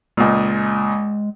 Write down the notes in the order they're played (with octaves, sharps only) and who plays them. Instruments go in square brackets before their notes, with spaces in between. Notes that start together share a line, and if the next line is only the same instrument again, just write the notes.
[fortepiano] C#2 A#2 [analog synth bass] G#3